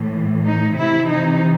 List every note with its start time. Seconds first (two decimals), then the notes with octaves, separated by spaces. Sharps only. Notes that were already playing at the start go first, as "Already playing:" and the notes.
Already playing: A2 E3
0.43 D#4
0.76 C3 E3 E4
1.09 D#4